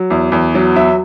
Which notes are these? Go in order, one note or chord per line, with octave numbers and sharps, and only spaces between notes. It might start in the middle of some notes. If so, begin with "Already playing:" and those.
Already playing: F#3
E2
E2
F#3
F#3 E5